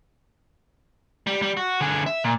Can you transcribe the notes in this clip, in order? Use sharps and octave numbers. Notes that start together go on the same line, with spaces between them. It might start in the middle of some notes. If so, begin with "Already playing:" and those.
G3
G3
F#4
D3 G#4
E5
A#2